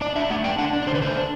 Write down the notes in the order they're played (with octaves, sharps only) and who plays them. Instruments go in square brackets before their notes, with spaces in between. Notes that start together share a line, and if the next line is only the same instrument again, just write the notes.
[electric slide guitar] D4 D5
D4 E5
A3 F#5
D4 G5
D4 F#5
D4
D5
D3 C5
B4
A3 C5
D4